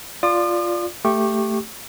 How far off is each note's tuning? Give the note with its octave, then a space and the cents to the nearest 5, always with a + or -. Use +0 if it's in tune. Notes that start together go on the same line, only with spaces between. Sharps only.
F4 +0 D5 +0 D#6 -45
A3 +10 G4 +0 C#6 -20